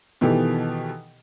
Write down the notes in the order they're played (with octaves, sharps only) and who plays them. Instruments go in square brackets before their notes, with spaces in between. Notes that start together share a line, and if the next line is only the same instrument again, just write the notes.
[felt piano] B2 D#3 E3 G4 A4